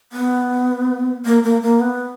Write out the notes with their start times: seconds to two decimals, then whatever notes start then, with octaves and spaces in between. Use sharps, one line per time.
0.12 B3
1.25 A#3
1.43 A#3
1.62 A#3
1.80 B3